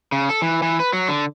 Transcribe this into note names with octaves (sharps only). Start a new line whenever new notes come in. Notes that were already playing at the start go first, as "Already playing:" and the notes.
C#3
A4
E3
E3
B4
F#3
D3